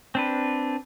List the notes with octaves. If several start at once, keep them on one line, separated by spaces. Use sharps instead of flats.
C4 D4 B4